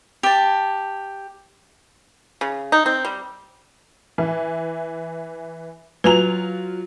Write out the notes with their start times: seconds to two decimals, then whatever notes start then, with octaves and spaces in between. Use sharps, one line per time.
0.23 G4 A5
2.41 C#3
2.72 D#4
2.86 C4
3.05 G3
4.18 E3
6.04 F#3 F4 B4 G#5 A#5 F7